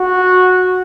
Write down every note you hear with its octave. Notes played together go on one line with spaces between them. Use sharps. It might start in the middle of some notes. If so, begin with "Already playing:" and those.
Already playing: F#4